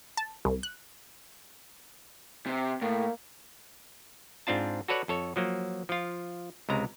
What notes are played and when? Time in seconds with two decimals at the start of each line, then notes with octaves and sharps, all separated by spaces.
0.17 A5
0.45 C2
0.63 F#6
2.46 C3
2.82 A2 A#3
4.47 G#2 C4 D4 F4 A5
4.88 F#4 A4 B4 C#5 D5 F#5
5.08 F2 A4 C#5
5.36 F3 F#3 A#3
5.89 F3 F4
6.69 C#2 C3 G#3 A#5